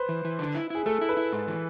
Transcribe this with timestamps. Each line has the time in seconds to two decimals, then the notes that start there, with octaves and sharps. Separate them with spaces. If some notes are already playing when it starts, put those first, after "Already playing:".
Already playing: B4 C5
0.09 E3
0.25 E3
0.39 D3
0.55 E4
0.70 E4 G#4
0.86 A3 A4
1.01 E4
1.09 B4
1.17 E4
1.33 G#2
1.47 E3